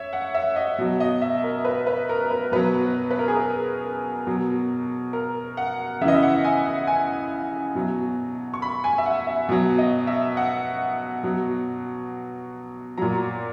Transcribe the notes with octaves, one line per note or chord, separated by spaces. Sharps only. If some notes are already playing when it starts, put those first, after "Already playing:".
Already playing: C#5 E5
F#5
E5
D#5
B2 F#3
D#5
E5
A#4
B4
B4
A#4
B4
B2 F#3 B4
B4
A#4
G#4
A#4
B2 F#3
A#4
F#5
C#3 E3 D#5 E5
E5
F#5
G#5
F#5
G#5
B2 F#3
C#6
B5
G#5
E5
F#5
E5
B2 F#3
D#5
E5
F#5
B2 F#3
A#2 F#3 A#5